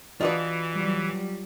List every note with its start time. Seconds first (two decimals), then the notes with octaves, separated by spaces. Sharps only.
0.21 E3 F4 F#4 B4 D5 D#5
0.72 F#3 G3